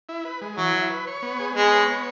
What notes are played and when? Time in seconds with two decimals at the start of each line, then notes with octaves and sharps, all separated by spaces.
0.09 E4
0.25 B4
0.41 G#3
0.57 E3 F#3
0.74 E4
0.90 B4
1.07 C#5
1.23 B3
1.39 G#4
1.55 G#3 B3
1.72 C#5
1.88 B3